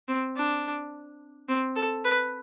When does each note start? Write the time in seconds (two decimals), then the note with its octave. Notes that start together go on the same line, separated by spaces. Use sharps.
0.08 C4
0.36 D4
1.49 C4
1.76 A4
2.05 B4